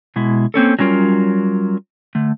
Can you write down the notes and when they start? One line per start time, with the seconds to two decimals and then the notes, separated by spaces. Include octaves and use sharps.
0.16 B2 G#3 E4
0.54 A#3 C4 C#4 A4
0.79 F#3 G3 C#4 F4 A#4
2.15 D3 A3